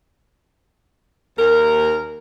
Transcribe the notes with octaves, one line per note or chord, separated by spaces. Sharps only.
D#2 A#4